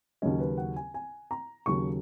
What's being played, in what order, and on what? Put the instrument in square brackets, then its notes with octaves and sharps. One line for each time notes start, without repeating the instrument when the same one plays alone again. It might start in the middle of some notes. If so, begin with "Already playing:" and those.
[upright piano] D#2 C#3 F#3 C#4 D#5
B4
F#5
G#5
G#5
A#5
D#2 C#3 F#3 C#6